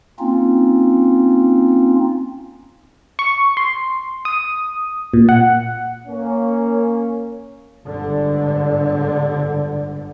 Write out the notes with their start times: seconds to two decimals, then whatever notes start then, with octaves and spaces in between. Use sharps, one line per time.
0.20 A#3 C4 C#4 D#4 F4
3.19 C#6
3.57 C6
4.25 D#6
5.14 A#2
5.29 F#5
6.07 A#3 C#4
7.86 G1 G#2 D3